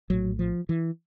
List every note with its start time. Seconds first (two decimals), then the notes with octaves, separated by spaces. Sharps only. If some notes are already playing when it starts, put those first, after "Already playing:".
0.10 A#1 A2 F#3
0.39 F3
0.69 E3